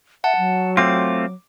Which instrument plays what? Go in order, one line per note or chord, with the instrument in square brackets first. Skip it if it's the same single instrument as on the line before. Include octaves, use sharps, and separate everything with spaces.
[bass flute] E5 [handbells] F#5 A5
[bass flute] F#3
[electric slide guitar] A3 C4 F4 [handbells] D6